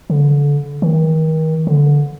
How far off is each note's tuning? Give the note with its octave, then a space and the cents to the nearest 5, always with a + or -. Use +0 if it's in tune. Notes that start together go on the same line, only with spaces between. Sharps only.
D3 -30
D#3 +35
D3 -15